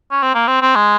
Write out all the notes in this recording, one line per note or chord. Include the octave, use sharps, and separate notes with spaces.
C#4
C4
A#3
C4
C4
G#3